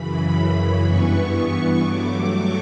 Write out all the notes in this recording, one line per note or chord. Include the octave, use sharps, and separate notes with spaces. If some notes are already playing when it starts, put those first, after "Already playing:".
Already playing: F#2 C#3 E3 B5
G2 E3 B3 C#6
C#6
G2 F#3 A3 D6
C#6